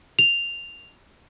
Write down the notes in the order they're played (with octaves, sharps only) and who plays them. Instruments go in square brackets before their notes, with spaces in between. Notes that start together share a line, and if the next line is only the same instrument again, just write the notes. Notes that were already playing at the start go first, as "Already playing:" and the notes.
[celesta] F7